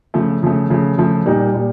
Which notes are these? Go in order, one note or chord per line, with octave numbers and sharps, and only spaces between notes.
C#3 F3 A3
C#3 F3 A3
C#3 F3 A3
C#3 F3 A3
A#2 G3 A#3 D#4
A#2 G3